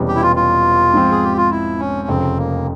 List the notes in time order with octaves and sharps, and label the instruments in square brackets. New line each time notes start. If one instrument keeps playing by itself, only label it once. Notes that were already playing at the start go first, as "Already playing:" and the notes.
Already playing: [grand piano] E1 E2 C3 G3 C#4
[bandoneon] G4
E4
F4
F4
[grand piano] G#2 F3 C4
[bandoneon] G#4
G4
F4
E4
C#4
[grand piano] F1 F2 C#3 [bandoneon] C4
[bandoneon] A#3